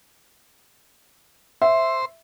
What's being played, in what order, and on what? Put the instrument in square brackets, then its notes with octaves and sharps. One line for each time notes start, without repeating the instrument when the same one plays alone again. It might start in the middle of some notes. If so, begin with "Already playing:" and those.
[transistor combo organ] C5 [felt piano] E5